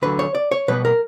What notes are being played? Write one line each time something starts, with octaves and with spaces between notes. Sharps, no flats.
D2 D3 F#3 B4
C#5
D5
C#5
B2 G3 B3 B4
A#4